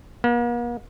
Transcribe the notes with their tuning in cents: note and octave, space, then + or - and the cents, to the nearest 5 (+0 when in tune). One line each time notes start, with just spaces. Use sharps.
A#3 +45